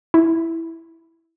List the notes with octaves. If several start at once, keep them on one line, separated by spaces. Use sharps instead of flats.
E4